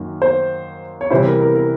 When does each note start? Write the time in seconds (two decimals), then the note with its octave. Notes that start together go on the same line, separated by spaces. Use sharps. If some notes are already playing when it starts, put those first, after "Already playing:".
Already playing: F#2 D#3 F#3 A#3
0.22 C5
1.01 C#5
1.10 C3 E3 G3 C4 E4 C5
1.25 A#4
1.41 A#4
1.55 A#4